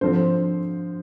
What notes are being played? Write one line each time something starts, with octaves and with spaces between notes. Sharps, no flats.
D3 F3 C4 C5